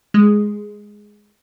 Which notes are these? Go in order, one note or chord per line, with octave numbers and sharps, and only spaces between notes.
G#3